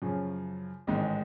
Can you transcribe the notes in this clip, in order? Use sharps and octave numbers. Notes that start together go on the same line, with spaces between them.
F#2 C#3 F3
A1 G#2 D#3 G#3